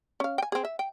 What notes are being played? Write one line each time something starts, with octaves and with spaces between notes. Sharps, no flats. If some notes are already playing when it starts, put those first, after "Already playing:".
C#4 F5
G5 G#5
C4 G#4
E5
G5